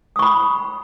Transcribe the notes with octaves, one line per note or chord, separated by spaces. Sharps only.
B5 C#6 D#6